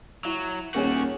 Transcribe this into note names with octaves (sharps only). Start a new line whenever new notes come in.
F#3 E4
D#1 A3 C#4 F#4 G#4 A#4